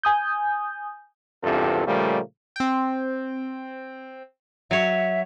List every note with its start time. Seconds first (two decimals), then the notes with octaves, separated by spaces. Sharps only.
0.03 G#5 D#6 G6
1.43 G#1 E2 G2 C3 F4 A4
1.87 A#2 C#3 F3 G3 A3 A#3
2.56 C4 G5
4.71 F#3 C#5 E5